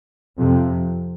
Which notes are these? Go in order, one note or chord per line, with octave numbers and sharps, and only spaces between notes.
F2 C3